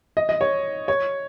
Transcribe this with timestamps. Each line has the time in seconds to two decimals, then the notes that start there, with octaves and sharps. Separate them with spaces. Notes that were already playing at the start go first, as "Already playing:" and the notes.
0.17 D#5
0.29 D#5
0.41 C#5
0.88 C#5